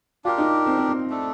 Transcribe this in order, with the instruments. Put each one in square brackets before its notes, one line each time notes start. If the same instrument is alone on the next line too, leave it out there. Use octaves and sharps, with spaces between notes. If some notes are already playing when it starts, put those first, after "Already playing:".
[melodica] D4 G4 A#4 [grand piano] F4
[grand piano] D#4
C4
C4
C4
[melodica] A3 D4 A4